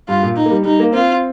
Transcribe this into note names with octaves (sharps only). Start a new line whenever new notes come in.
G2 F4
A#2
D#4
A#3
G3
G3 D#4
A#3
C4 F4